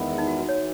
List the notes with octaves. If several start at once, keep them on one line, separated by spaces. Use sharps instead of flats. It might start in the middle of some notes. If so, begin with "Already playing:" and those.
Already playing: E2 D#3 G#3 B3 E4
D#4
F#4
F#4
C#5
E3